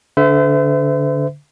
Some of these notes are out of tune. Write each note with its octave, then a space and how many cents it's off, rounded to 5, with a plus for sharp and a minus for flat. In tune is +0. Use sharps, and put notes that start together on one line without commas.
D3 -20 C5 -40 E5 +0